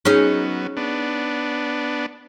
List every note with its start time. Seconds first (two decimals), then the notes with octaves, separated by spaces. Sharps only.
0.05 F#3 B3 C#4 D#4 G#4
0.77 B3 D4